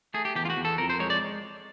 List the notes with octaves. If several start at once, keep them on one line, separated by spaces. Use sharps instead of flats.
A3 G#4
G4
E2 G4
F4
F#4
E2
A4
F2 A#4
C5
G#3 C#5
D5